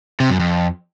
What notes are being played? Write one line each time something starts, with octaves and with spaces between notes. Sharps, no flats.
C3
F#2
F2